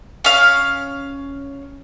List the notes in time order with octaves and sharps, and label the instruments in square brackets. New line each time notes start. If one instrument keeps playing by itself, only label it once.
[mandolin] C#4 F5